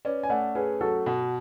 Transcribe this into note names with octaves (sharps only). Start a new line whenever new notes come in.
C#4 B4 D5
G#5
A3 D5 F#5
C#4 G#4 B4
F#3 F#4 A4
B2 F#4